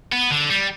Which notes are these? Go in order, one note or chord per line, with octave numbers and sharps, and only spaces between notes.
B3
D3
G3